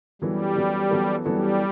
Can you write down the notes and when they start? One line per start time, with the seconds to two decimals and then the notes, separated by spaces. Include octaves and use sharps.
0.22 F#2 E3 G3 B3 E4 A4
0.56 F#2 E3 B3 E4 A4
0.91 F#2 E3 B3 E4 A4
1.25 F#2 E3 G3 B3 E4 A4